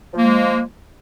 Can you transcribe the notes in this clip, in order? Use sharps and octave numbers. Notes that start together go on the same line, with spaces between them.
F3 G#3 A#3